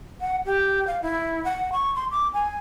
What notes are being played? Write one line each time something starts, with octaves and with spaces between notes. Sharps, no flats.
F#5
G4
F5
E4
F#5
C#6
C6
D6
G#5